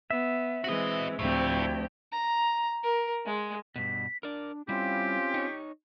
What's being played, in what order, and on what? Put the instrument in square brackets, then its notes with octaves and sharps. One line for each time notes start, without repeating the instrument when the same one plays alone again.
[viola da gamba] B3 [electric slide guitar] E5
[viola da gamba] E3 G#3 C4 [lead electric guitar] F#4 D#5
[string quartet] D2 G4 [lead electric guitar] A2 [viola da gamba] F3 C4
[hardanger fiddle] A#5
A#4
G#3
[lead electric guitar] G2 B2 [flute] B6
[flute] D4 [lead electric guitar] A#4 D5
[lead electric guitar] G3 E4 [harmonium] C4 C#4 F4 [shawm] G4 [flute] F5
[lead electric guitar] D#4 C#5